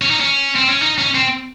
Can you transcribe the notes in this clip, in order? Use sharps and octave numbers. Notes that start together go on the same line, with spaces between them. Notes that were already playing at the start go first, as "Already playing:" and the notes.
C#4
D#4
C#4
C4
C#4
D#4
C#4
C4